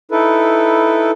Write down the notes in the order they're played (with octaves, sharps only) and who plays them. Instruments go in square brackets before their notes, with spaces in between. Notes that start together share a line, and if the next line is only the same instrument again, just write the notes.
[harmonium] D#4 E4 A4 B4